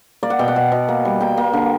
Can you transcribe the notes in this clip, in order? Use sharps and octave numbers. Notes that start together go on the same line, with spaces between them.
A#3 D5
F#5
B2 G5
F#5
B2
B2
A#3
G3
A#3 G5
A#3
D3